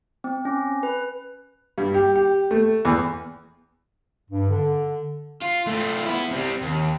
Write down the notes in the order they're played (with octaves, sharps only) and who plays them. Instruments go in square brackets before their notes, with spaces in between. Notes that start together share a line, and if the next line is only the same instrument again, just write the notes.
[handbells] C4
C#4
B4
[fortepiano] G2
G4
G4
A3
E2
[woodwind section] G2
D3
[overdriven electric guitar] F4
A3 F4
B3 E4
C3 G3
D#2